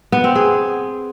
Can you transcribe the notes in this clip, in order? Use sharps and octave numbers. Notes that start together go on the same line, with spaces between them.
B3
C4
G#4